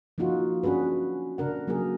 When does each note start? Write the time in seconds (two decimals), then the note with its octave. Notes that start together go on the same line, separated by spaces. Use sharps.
0.18 F3 A#3 D#4 F4 F#4
0.63 C#4 D4 F#4 G#4 B4
1.38 C#3 D4 A#4 F#5
1.67 F#3 A#3 G4 G#4 A#4